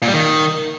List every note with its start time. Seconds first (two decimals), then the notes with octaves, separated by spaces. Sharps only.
0.02 A#2
0.08 G3
0.13 D#3